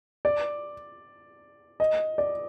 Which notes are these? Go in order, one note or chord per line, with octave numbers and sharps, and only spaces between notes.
D5
D#5
D5